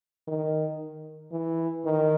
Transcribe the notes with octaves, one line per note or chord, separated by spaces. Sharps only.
D#3
E3
D#3